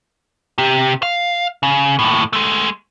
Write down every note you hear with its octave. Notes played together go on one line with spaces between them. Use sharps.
C3 G4
F5
C#3
D#2 A2
G#3 A3